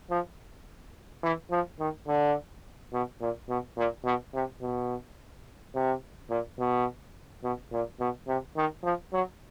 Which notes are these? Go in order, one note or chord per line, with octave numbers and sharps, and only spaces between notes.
F3
E3
F3
D#3
D3
B2
A#2
B2
A#2
B2
C3
B2
C3
A#2
B2
B2
A#2
B2
C3
D#3
F3
F#3